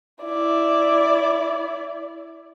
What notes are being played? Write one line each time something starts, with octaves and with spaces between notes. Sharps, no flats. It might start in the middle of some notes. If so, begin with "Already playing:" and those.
E4 D5